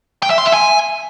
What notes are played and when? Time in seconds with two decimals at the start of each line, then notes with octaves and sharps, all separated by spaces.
0.23 G5
0.30 E5
0.38 C6
0.46 E5
0.53 G#5